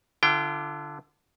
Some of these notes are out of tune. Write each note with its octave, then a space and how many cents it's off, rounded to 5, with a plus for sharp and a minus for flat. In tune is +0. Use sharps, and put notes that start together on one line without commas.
D3 +0 F4 -40 G5 +0